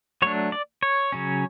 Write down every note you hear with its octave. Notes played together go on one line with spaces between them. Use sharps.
F#3 A3 D4 C#5
D5
C#5
C#3 F#3 C#4